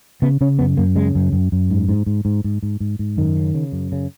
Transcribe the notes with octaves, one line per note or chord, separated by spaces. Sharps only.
C#3 B3
C#3 C#4
F#2 B3
F#2 A#3
C#3 G#3
F#2
F#2
F#2
G#2
G#2
G#2
G#2
G#2
G#2
G#2
G#2
F#2 D#3
C#3
C#3
F#2
C#3